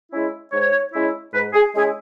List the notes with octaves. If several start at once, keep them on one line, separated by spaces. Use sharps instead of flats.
G#3 C#4 E4
G#2 C#5
G#3 C#4 E4
G#2 B4
G#4
G#3 C#4 E4 G#4